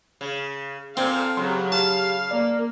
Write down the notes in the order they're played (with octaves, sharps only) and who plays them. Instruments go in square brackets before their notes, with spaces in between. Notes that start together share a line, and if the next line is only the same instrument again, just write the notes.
[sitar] C#3
[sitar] A#2 [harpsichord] C4 [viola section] A4 F5
[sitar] C#3 [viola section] F#3 G4 [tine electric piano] C6
[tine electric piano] G4 [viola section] F5 [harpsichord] A5
[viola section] A#3 [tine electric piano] D5